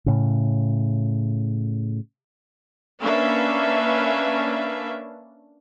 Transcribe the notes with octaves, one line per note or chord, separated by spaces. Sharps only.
A2 C#3
A#3 C#4 D4 B4 E5 F5